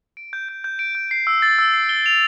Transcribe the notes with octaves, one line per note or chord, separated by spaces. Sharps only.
D7
G6
G6
G6
D7
G6
C7
E6
A6
E6
C7
G7
F7